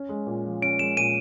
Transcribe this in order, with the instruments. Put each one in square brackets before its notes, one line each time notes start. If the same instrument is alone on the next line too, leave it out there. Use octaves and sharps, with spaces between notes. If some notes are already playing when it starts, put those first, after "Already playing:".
Already playing: [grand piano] C#4
G#3
A#2
F3
[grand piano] C#4 [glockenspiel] D7
[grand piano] G#3 [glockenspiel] E7
[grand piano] A#2 [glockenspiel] D#7